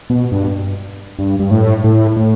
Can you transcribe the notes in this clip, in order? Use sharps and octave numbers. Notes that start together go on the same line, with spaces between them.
B2
G2
G2
G2
A2
A2
A2